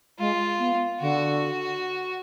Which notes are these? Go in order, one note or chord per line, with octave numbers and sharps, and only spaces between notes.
G#3 F4
B3
D3 F#4